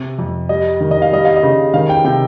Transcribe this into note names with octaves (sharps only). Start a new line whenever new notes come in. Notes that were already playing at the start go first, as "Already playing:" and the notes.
Already playing: C3
F2
G3 D#5
D#3
D#5
F5
G3 D#5
F5
D#5
C#3
D#3 F5
G5
C3 G5